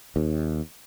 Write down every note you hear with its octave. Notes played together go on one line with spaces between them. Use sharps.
D#2